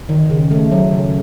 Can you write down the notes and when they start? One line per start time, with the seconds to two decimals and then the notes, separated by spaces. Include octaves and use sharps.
0.09 D#3
0.30 C#3
0.51 A3
0.72 F#3
0.93 C#3